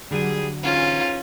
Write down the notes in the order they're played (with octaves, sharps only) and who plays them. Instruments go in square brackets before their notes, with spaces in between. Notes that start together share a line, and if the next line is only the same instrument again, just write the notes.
[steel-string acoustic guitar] D3 F#3 [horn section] G3 G#4
[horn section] G#2 E3 C#4 [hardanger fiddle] F4